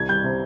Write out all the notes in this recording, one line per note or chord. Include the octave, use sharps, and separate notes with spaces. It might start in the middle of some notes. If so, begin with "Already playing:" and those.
Already playing: C2 G#6
G3 G6
C3